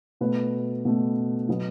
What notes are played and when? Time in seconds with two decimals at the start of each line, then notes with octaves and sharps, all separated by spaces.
0.21 B2 A3 B4
0.85 B2 A3
1.49 B2 F#3 B3